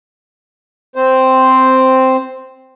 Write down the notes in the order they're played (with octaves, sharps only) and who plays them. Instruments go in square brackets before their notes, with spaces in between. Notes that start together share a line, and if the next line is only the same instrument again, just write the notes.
[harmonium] C4 C5